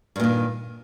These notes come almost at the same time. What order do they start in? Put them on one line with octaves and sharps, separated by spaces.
G2 A#2 D#3